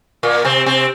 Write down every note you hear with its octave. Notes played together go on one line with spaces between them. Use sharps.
A#2 A#3
C3 C4
C3 C4